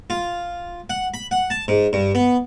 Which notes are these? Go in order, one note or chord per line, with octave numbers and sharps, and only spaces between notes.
F4
F#5
B5
F#5
A5
G#2
G2
B3